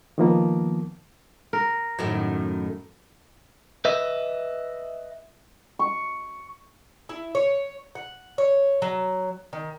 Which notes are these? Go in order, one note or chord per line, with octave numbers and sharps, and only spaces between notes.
D#3 F3 A#3 B3
A#4
F#2 A2 D#3
B4 D#5 E5
C#6
E4
C#5
F#5
C#5
F#3
D#3